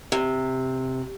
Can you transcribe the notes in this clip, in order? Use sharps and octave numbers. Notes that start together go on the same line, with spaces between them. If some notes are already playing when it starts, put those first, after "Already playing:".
C3